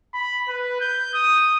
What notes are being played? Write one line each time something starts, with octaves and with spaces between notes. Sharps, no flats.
B5
B4
G6
D#6